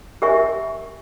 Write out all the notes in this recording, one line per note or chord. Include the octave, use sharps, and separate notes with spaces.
G4 A#4 E5 G#5 C#6